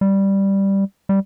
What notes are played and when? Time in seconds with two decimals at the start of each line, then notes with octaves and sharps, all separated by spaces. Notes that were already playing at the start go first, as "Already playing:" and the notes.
0.01 G3
1.09 G3